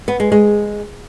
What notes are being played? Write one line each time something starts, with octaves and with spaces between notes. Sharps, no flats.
B3
G#3
G#3